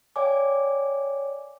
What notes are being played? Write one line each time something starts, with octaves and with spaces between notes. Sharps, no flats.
C#5 D5 F5 G5 G#5 D6